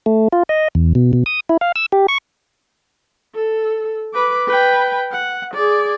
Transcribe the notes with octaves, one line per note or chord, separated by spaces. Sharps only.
A3
F4
D#5
E2
B2
B2
D#6
E4
F5
E6
G4
C#6
A4
B4 D6
B4 G5
F#5
G#4 D5